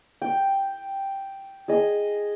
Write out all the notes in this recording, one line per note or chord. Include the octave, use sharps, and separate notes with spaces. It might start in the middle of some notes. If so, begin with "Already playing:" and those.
G5
G#4 D#5